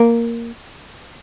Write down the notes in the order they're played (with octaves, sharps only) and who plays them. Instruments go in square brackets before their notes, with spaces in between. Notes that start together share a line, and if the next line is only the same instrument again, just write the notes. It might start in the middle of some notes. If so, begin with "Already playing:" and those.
Already playing: [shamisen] A#3